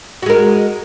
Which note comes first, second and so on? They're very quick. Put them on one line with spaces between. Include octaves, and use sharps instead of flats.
F#4 G#3 A#4